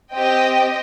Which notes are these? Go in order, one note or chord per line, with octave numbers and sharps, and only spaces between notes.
C4 G4 D#5 G5